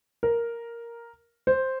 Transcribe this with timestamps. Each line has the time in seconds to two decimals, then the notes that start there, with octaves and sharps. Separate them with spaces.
0.23 A#4
1.47 C5